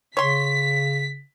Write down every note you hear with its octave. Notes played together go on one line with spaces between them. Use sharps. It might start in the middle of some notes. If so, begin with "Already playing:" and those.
C#3 C#5 C6 B6